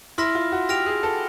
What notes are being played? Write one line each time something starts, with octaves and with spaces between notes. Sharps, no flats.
E4 C6 F6 A#6
F4
F#4
G4 F6 A#6 D7 F7
G#4
A4